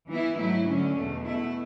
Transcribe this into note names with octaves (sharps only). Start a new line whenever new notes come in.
E3 B3 E4
G#2 F#3 A3 E4
D3 F#3 C#4
E2 B2 A3
B2 A3 E4